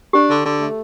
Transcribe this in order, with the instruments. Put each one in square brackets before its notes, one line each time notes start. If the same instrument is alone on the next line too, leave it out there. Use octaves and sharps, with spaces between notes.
[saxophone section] D4 [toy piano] G4
[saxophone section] D3
D3
A3